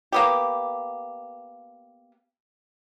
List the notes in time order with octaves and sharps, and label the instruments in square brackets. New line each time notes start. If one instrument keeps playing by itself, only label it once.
[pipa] A#3 B3 G4